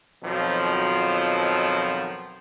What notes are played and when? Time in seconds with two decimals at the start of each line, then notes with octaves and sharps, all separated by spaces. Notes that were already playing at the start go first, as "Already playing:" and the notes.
0.23 F2 B2 D#3 F3 F#3